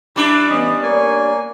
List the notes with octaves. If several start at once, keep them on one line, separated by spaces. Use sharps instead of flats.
G3 D4 E4 D6
A2 E3 B3 C#4 D#5
A#3 A#4 C#5 D5 G#5 C#6